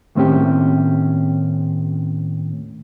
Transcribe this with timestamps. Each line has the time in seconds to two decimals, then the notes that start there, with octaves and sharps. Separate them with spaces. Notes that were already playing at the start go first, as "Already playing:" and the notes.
0.15 D#2 A2 C4 C#4 G4